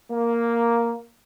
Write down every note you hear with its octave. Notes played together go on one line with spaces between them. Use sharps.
A#3